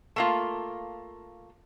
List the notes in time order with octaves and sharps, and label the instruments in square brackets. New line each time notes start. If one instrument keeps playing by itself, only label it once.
[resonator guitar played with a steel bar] A3 A#3 F4